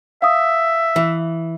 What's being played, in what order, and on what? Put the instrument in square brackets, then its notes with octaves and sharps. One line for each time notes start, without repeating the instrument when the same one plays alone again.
[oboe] E5 [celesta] F5 D#6
[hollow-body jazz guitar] E3